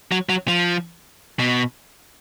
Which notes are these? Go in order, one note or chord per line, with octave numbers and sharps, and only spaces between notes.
F#3
F#3
F3
B2